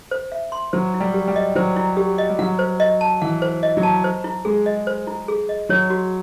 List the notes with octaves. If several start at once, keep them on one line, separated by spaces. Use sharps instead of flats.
C5
E5
C6
F#3 C5
E4
G3
G4
G3
D#5
F#3 C5
E4
G4
D#5
G3
F#3 F#5
C5
D#5
A5
E3 F#5
C5
D#5
F#3
A5
C5
E4
G#3 G#4
D#5
C5
E4
G#4
D#5
F#3 C#5
F#4